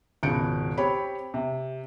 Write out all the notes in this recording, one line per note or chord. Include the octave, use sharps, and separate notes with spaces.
G#1 C#2 B2 G6 C#7 D7
C4 G4 C#5 B5
C3